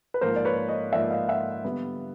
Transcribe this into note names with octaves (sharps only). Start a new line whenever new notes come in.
B4
G#2 F3 A#3 A#4 C5
D5
B4 C#5
C#5 D#5
G#2 F3 A#3 D5 E5
D#5 F5
E5 F#5
D3 G3 B3